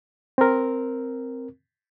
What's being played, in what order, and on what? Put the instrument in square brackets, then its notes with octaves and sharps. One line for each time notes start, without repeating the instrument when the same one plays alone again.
[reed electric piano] C4 A#4